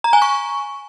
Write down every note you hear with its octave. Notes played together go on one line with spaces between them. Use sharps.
A#5
G#5
C#6